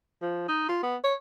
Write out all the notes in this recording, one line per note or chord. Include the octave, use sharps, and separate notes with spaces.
F3
D#4
F4
B3
C#5